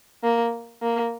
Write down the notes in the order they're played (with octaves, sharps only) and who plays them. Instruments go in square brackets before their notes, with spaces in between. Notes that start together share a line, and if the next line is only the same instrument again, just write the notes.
[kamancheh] A#3
A#3